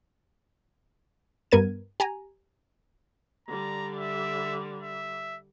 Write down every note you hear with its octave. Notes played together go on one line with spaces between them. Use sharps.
G2 B3 A#4 G#6 D#7
G4 G#5 A#5
D3 G3 A#5
E5
E5